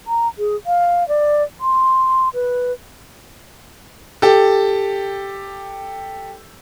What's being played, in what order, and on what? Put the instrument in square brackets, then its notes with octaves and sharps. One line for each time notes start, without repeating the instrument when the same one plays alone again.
[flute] A#5
G#4
F5
D5
C6
B4
[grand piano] G4 A4